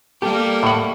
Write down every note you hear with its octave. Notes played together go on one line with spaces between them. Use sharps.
G3 A#3 G4 A4
A2 F#5